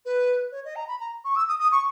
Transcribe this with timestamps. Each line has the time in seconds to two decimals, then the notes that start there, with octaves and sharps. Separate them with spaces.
0.05 B4
0.51 C#5
0.64 D#5
0.75 A#5
0.87 B5
0.99 A#5
1.24 C#6
1.35 E6
1.48 D#6
1.59 D#6
1.71 C#6